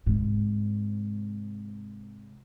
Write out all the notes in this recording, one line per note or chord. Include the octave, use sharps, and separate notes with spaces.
G#2 C3